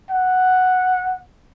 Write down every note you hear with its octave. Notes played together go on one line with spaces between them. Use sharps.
F#5